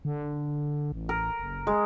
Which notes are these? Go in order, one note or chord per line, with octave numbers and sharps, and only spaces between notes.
D3
A1
A#4
F#1
G#3